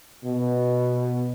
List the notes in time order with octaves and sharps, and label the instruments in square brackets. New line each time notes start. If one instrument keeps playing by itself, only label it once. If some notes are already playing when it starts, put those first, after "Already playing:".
[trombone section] B2